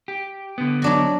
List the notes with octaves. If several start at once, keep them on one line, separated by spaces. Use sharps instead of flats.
G4
D3 B3
F#3 D4 F#4